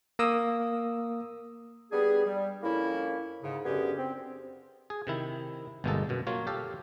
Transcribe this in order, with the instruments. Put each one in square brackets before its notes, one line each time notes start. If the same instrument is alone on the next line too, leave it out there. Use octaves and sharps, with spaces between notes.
[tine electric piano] A#3 D#6 E6
[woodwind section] G3 B3 D4 G#4
G3
F2 A#3 C#4 E4
G#2 C#3
F#2 D3 B3 C#4 G4 G#4
C4
[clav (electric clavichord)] G#4
C3 D#3 E4
G1 B2 G#3 A#3 D#4 A4
F#2 B2
F#3 A#3 F4 C#5
G4 A4 F5